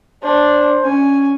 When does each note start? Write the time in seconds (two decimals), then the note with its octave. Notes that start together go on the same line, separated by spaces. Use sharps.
0.23 D4 C5
0.85 C#4 G#5